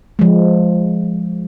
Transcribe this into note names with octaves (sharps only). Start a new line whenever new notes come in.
F3 G#3